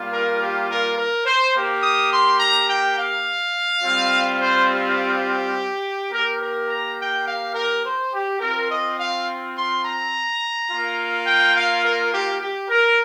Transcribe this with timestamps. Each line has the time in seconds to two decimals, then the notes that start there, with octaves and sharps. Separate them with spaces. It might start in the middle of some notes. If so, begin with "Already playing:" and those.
Already playing: G3 A#3 F4
0.11 A#4
0.39 G4
0.68 A#4
0.96 A#4
1.25 C5
1.54 A#3 G4
1.82 D#6
2.10 C6
2.40 A#5
2.68 G5
2.96 F5
3.82 G3 C4 F4
4.40 C5
4.68 G4
6.11 A#3 G4 A#4
6.39 A#4
6.68 A#5
6.97 G5
7.26 F5
7.54 A#4
7.83 C5
8.12 G4
8.40 C4 F4 A#4
8.69 D#5
8.98 F5
9.54 C6
9.83 A#5
10.69 A#3 F4
11.26 G5
11.54 F5
11.84 A#4
12.12 G4
12.40 G4
12.70 A#4